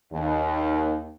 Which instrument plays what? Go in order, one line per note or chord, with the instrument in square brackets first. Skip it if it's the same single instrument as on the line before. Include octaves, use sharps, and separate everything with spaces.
[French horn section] D#2